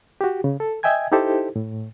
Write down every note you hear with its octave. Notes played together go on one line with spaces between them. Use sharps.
F#4 G4
C#3
A4
D#5 E5 G5 G#5 G#6
D#4 E4 G4 A4 C5
A2